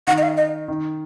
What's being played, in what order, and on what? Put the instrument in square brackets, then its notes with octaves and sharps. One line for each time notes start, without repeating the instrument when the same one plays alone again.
[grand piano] D#3 [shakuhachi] F#5
[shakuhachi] D#5
F5
D#5
[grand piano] D#3